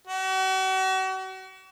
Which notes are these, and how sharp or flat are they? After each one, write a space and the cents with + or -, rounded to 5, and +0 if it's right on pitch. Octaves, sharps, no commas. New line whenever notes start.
F#4 +40